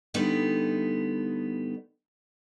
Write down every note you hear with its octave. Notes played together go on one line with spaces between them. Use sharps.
D3 G3 A3 B3 D#4